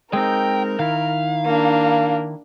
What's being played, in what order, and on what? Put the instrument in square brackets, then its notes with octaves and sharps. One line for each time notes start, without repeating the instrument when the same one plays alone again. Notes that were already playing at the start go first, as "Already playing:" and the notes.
[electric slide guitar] G#3 C4 D#4 [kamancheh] A#4 [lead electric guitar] G5
[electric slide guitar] D#3 E4 [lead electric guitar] F5
[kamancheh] A#3 D4